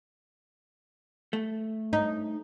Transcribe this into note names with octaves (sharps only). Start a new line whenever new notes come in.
A3
D#4